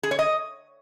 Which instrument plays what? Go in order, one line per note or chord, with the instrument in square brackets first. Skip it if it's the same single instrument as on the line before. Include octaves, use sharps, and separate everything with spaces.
[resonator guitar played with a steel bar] G#4
C#5
D#5